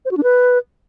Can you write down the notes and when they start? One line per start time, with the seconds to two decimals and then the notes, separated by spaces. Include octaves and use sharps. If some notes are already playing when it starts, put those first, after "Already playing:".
0.05 C5
0.11 F#4
0.17 D4
0.23 B4